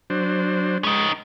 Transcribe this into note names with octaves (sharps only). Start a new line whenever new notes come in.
F#3 D4 C5
G#3 C#4 D#4